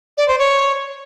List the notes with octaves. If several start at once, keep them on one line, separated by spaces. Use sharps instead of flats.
D5
C5
C#5